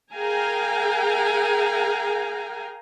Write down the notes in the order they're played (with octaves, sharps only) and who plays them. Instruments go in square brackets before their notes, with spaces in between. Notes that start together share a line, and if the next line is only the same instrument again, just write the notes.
[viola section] G#4 A#4 F5 G5 G#5 A#5